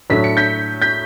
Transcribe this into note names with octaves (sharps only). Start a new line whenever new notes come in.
A2 F#3 A3 D4 B6
C#7
G6 B6
G6 B6